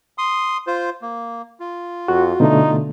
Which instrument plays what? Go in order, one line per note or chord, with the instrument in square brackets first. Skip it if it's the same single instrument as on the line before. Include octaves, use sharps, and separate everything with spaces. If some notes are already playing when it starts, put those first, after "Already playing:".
[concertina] C6 D#6
F4 C5
A#3
F4
[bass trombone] F2 [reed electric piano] F#4
[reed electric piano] B2 D3 A3 [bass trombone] D#4